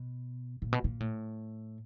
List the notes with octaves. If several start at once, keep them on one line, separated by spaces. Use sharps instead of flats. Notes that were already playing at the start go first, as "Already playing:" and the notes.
Already playing: B2
A#2
B2
A#2
A2